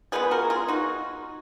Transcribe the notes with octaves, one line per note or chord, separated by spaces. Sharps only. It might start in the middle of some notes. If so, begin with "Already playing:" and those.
F3 G#3 B3 G#4 B4
F#4 A#4
F4 G#4
D#4 F#4